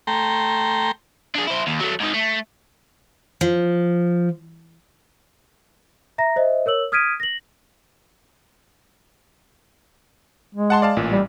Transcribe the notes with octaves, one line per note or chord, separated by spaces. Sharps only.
A3 G5 A#5 C6
D4 G#4
E4 C5
D#2
F#3 A3
G#2 D#3
A3
F3
E5 A#5 A#6
C5 D#5 E5
A#4 C#5 E6 F#7
D#6 F6 G#6 B6 D7 D#7
A#6 F#7
G#3
F#5 A5 C6
D5 F5 A5
A1 A#2
G3